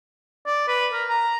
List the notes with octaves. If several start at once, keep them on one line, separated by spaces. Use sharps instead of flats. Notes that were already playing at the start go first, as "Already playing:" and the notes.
D5
B4
A#4
A#5